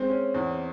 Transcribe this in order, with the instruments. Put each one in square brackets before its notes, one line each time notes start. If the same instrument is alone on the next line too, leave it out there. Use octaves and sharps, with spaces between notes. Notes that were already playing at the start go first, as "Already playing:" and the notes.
Already playing: [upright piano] G#3 [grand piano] C4
[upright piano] C#4
E2